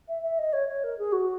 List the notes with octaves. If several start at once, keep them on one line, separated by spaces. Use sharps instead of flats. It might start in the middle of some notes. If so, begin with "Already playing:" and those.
E5
E5
D#5
C#5
C#5
A#4
G#4
F#4